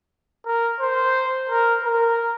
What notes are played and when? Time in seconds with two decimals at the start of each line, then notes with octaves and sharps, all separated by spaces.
0.46 A#4
0.81 C5
1.50 A#4
1.85 A#4